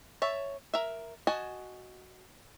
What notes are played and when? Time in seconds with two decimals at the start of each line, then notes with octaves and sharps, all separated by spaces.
0.22 C#5 E5 A5
0.74 A#4 E5
1.27 F#4 D#5 G#5 A5